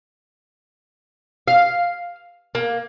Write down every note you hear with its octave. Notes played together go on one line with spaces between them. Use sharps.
F5
A#3